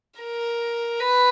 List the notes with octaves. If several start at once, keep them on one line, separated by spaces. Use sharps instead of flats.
A#4
B4